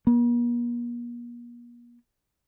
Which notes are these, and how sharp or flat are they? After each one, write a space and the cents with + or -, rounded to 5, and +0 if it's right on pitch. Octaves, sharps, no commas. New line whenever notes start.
A#3 +45